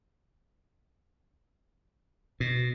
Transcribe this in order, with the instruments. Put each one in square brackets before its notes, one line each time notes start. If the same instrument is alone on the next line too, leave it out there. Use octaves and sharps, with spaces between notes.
[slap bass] B2